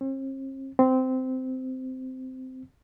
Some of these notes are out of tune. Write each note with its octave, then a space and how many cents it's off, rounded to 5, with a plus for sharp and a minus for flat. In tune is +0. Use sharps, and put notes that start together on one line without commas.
C4 +45
C4 -15